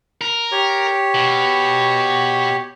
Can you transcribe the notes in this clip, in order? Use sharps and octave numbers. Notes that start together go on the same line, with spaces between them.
A#4
G4 C#5
B2